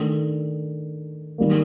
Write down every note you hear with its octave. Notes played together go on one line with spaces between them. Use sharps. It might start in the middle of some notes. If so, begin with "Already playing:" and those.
Already playing: D#3 A3 D4
D#3 G3 A#3